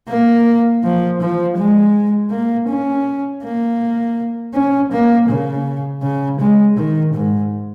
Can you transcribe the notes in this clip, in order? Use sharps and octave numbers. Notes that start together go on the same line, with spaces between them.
A#3
F3
F3
G#3
A#3
C#4
A#3
C#4
A#3
C#3
C#3
G#3
D#3
G#2